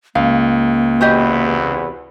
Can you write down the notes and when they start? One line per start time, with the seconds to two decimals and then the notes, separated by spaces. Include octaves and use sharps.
0.15 C#2 A#3 F5
1.01 E2 C3 F#4 G4 B4 D#5